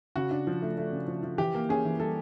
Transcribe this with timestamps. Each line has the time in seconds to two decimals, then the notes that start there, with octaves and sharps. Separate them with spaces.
0.16 C#3 F#4
0.31 D4
0.47 F3
0.62 A3
0.78 A3
0.92 C#3
1.08 F3
1.23 F3
1.38 E3 G4
1.55 A#3
1.69 C#4 G#4
1.85 E3
2.00 G3 A4